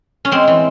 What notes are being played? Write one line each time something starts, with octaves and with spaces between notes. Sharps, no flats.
C#4
G#3 C4
E3